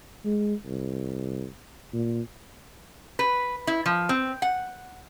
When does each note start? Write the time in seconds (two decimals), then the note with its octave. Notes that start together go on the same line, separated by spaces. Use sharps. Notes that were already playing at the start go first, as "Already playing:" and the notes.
0.25 G#3
0.66 C2
1.93 A#2
3.19 B4
3.67 E4
3.86 F3
4.09 C4
4.42 F#5